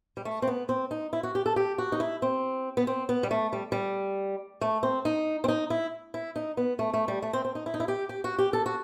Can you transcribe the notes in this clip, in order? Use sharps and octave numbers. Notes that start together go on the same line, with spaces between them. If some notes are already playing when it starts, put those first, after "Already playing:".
G3
A3
C4
B3
C4
D#4
E4
F#4
G4
A4
G4
F#4
D#4
E4
C4
B3
C4
B3
G3
A3
G3
G3
A3
C4
D#4
C4
D#4
E4
E4
D#4
B3
A3
A3
G3
A3
C4
C4
D#4
E4
D#4
E4
G4
G4
F#4
G4
A4
F#4